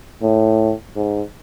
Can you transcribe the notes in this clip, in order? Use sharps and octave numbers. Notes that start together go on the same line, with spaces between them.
A2
G#2